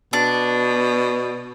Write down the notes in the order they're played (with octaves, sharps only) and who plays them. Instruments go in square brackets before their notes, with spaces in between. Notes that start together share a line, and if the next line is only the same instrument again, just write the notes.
[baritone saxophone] B2 [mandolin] D4